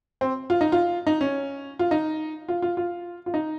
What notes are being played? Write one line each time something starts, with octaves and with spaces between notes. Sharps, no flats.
C4
F4
D#4
F4
D#4
C#4
F4
D#4
F4
F4
F4
F4
D#4